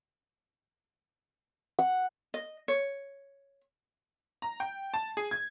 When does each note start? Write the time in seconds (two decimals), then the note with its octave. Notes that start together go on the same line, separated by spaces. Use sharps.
1.79 F#5
2.34 D#5
2.68 C#5
4.42 A#5
4.60 G5
4.94 A5
5.17 G#4
5.31 G#6